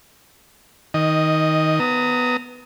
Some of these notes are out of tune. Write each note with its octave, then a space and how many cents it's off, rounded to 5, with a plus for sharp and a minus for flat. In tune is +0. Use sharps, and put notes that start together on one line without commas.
D#3 +20 D#5 +0
B3 +5 A#5 -20 D#6 +20